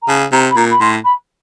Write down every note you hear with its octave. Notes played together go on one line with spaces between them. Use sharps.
A#5
C#3 A5
C3 A#5
B5
A#2 A#5
B5
A2 C6
B5